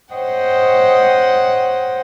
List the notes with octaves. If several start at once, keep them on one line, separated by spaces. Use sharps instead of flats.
C5 C#5 D#5 F#5 G5